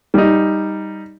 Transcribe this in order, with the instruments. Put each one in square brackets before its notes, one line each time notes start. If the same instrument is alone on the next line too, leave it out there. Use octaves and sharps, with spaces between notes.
[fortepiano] G3 D#4